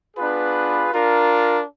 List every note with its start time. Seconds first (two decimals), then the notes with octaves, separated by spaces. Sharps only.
0.17 B3 D4 F4 G#4 B4
0.91 D4 F4 A#4